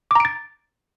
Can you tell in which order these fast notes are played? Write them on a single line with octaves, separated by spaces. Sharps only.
D6 A#5 D7 A6